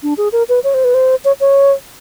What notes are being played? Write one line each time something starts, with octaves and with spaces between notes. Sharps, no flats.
D4
G#4
A#4
B4
C#5
C5
B4
C5
C#5
C#5